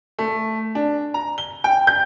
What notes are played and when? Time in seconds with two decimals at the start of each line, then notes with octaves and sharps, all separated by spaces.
0.19 A3
0.75 D4
1.14 A#5
1.38 G7
1.64 G5
1.87 G6